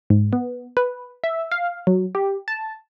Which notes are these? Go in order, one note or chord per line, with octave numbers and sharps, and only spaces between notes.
G#2
B3
B4
E5
F5
F#3
G4
A5